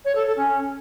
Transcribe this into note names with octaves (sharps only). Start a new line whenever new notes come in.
C#5
A4
A4
C#4